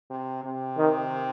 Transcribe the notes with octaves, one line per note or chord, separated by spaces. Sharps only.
C3
C3
D#3